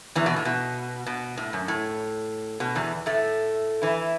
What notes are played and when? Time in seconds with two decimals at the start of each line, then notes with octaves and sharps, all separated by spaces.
0.15 E2 E3
0.26 B2
0.36 A2
0.45 B2
1.06 B2
1.37 A2
1.53 F#2
1.68 A2
2.60 B2
2.75 E2 E3
3.06 A2 A3
3.82 E3 E4